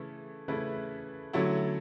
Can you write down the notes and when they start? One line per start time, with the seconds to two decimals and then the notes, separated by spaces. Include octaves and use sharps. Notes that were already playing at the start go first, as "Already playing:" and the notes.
Already playing: C#3 E3 A3 E4
0.48 C#3 E3 A3 E4 B4
1.33 D3 F#3 A3 C#4 E4